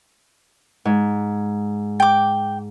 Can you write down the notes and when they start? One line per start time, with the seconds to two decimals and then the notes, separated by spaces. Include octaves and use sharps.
0.85 G#2
2.00 G5 D6